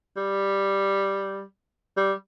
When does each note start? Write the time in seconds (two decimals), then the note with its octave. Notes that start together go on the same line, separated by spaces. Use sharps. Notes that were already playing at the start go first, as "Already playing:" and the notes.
0.16 G3
1.97 G3